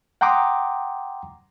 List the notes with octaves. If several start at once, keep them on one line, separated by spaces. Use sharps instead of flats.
F#5 G5 A#5 C6 D6 D#6